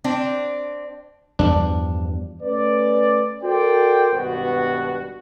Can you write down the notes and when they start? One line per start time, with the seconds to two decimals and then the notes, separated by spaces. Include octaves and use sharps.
0.04 C4 D4
1.39 E2 G2 F3 D4
2.42 A3 C#4 B4 D5
3.43 F#4 A4 A#4 C5 D5 G5
4.13 G#1 G2 B2 B3 F#4